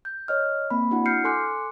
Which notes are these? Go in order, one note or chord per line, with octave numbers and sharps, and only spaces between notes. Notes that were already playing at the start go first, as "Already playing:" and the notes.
G6
C#5 D#5 F6
A#3 C4 B5
D4 E4 F#4 F#5
F6 G6 C7 C#7
A4 G#5 C6 D6 F#6 C#7